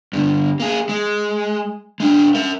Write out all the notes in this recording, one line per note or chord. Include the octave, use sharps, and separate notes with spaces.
G2 D3
A#3 G#4
G#3
G#3 D4
A#4 E5